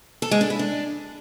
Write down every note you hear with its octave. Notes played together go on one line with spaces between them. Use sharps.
A4
G#3
D4
E4
D4